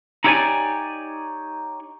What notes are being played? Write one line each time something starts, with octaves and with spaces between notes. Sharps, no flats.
D#4 E4 G4 C#5 D5 G#5